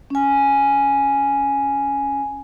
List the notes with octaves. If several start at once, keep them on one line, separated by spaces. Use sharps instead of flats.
C#4 G#5